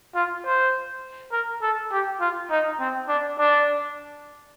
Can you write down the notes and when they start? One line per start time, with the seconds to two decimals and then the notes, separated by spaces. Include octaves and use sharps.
0.15 F4
0.45 C5
1.32 A#4
1.62 A4
1.91 G4
2.20 F4
2.51 D#4
2.80 C4
3.08 D4
3.39 D4